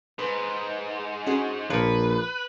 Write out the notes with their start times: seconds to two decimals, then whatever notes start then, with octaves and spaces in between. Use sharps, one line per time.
0.19 G#2 B4
1.26 C#4 F#4 G#4
1.70 A#1 F3 A#3 B4 C#5